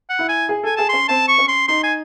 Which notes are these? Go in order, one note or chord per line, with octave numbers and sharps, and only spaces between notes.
F#5
E4
G#5
G#4
A4 G#5
G#4 A5
C#4 C6
C4 A5
C#6
C#4
C6
D#4 C6
G#5